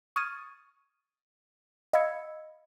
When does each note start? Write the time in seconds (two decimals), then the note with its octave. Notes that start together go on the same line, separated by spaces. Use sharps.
0.16 C#6 D#6 F6 G#6 A6 D#7
1.93 D#5 F5 B5 E6 G#6 C#7